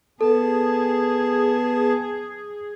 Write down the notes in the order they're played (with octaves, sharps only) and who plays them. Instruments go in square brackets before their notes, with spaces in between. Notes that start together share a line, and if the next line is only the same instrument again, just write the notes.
[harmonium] B3 A5 [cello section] G#4 [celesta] A4